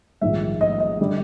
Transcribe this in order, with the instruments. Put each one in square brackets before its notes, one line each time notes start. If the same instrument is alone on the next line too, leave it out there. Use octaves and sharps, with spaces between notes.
[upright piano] A#1 G#2 D#3 G3 E5
D#5
D#5
D3 G3